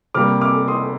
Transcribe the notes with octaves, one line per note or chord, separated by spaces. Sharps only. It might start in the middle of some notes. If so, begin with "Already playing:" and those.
C3 G3 A#3 D6 F6
D6 F6
C6 D#6